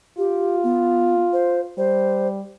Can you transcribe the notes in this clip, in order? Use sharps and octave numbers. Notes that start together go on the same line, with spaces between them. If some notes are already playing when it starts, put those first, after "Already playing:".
F4 G4
B3
C5
G3 C5